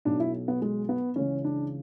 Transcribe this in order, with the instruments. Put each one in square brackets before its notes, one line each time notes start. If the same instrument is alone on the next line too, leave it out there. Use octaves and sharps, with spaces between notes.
[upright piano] B1 B2 F#3 D4
E4
B3
G#3
B3
C#2 C#3 E3 C#4
D4